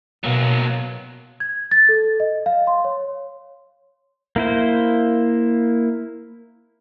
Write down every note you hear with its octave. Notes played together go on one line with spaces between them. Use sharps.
B2 F#3 A#3
G#6
A6
A4
D#5
F5
C6
C#5
A#3 E4 C5